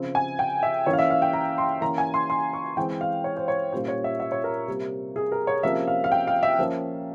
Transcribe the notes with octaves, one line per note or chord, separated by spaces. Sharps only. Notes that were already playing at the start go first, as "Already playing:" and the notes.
Already playing: C#3 F3 C4
G#5
G5
E5
E3 A#3 C#4 C#5
F5
E5
F5
G5
A#5
C6
E3 A#3 C#4 A#5
G#5
C6
C6
C#6
E3 G#3 C4 G5
F5
C#5
C5
C#5
A#2 G3 A#3 C#4 C5
C#5
E5
E5
C#5
A#4
C3 G3 A#3
G#4
A#4
C#5
C3 F3 A#3 C#4 E5
F5
F5
G5
F5
E5
F3 A#3 C#4